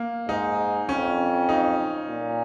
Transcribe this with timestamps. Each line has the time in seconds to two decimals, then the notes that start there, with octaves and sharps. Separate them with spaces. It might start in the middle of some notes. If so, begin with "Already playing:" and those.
Already playing: A#3
0.28 G#2 D#4
0.89 F2 C#4
1.49 D#4
2.08 A#2